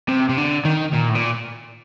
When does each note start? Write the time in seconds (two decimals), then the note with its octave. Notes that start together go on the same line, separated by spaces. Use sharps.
0.09 C3
0.29 C3
0.38 D3
0.65 D#3
0.93 A#2
1.09 A2
1.15 A#2